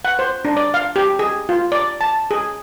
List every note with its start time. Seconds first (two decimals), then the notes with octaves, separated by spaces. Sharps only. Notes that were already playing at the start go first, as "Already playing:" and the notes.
0.05 F#5
0.19 C5
0.45 D4
0.57 D5
0.74 F5
0.96 G4
1.19 G#4
1.49 F4
1.72 D5
2.01 A5
2.31 G#4